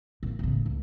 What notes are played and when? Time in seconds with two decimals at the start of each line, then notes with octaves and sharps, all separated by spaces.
0.23 A#2
0.39 A2 C#3
0.66 C#2